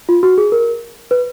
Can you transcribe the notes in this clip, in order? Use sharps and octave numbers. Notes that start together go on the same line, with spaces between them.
F4
F#4
G#4
A#4
B4